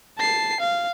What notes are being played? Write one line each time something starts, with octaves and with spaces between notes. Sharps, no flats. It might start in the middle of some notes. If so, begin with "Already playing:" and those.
A5 C7
F5